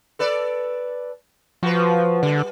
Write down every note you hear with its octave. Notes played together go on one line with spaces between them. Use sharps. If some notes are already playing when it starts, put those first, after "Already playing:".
A4 B4 D5
F3 F#4 B4
D3 G3